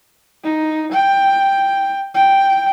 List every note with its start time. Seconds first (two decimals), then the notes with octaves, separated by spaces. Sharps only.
0.44 D#4
0.92 G5
2.14 G5